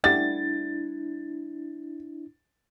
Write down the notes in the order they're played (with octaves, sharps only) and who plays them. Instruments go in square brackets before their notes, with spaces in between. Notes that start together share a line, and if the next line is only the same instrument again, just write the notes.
[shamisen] G3 A3 F#4 [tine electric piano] D4 E4 [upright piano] A6